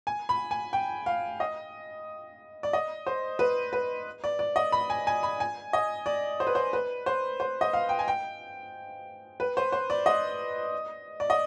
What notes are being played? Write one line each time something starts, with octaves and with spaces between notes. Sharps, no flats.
G#5
B5
G#5
G5
F5
D#5
D5
D#5
C5
B4
B4
D5
D5
D#5
B5
G#5
G#5
B5
G#5
D#5
D5
C5
B4
C5
B4
C5
C5
D#5
F5
G5
G#5
G5
B4
C5
C5
D5
D#5
D5
D#5